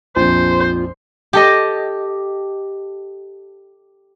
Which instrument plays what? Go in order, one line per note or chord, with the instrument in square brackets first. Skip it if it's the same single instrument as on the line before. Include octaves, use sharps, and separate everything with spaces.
[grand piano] A#1 F2 [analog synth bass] F4 [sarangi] C5
[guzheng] G4 A4 D#5